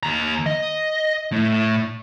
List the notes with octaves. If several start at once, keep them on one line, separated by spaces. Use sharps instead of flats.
D#2 A#5
D#5
A2